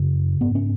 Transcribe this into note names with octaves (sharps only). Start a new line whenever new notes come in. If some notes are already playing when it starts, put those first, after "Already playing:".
Already playing: F#2 C#3
G#2 B3
C#4